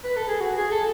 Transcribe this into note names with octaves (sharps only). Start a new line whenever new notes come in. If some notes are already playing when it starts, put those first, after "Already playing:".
B4
A4
G#4
F#4
G#4
A4